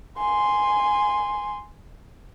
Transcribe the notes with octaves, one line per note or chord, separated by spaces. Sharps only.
G#5 C6